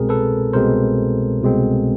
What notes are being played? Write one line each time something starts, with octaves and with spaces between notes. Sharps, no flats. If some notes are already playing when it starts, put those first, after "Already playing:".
Already playing: C2 B2 G#3 C4 G#4 A#4
A4 B4
C2 B2 G#3 C4 A#4 C5
C2 B2 G#3 C4